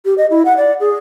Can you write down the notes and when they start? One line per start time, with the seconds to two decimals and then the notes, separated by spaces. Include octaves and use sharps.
0.05 G4
0.18 D#5
0.30 E4
0.45 F#5
0.57 D5
0.80 G#4